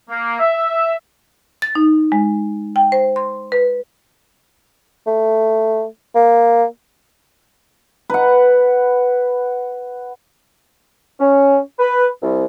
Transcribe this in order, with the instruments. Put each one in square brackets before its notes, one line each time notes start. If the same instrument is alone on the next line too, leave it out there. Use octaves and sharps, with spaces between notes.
[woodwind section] A#3
E5
[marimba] A6
D#4
G#3
G5
C5
C6
B4
[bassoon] A3
A#3
[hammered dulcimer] B4 F#5
[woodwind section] C#4
B4
C2